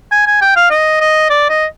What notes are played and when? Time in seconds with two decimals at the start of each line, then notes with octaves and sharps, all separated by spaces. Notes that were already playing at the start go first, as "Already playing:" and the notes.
0.12 G#5
0.27 G#5
0.41 G5
0.56 F5
0.70 D#5
1.01 D#5
1.30 D5
1.49 D#5